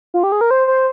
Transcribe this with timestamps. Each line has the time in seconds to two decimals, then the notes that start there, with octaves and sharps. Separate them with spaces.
0.14 F4
0.23 G4
0.32 G#4
0.41 A#4
0.51 C5
0.67 C5